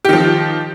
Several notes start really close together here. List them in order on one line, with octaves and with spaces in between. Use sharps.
G4 D#3 F3